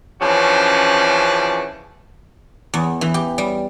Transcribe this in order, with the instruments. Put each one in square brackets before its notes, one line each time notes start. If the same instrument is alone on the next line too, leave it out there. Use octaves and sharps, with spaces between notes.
[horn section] C#3 E3 F3 C#4 D4 F#4
[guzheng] E2
E3
G4
G3